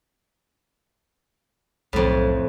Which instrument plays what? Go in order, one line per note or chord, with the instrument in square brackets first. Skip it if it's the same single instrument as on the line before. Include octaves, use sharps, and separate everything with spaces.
[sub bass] B1 [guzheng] F2 A2